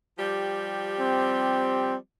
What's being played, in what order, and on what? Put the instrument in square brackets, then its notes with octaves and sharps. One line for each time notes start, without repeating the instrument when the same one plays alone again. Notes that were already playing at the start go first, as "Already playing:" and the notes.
[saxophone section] F3 G3 G4
[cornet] C4